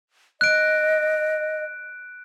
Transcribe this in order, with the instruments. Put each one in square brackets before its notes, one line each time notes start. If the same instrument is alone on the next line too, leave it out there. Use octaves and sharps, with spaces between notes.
[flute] D#5 [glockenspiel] F#6 D7